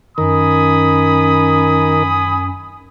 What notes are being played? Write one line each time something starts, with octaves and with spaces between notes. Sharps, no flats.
F#2 D#3 A#4 G#5 B5 D#6